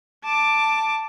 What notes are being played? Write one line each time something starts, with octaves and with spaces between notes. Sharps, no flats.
A5 D6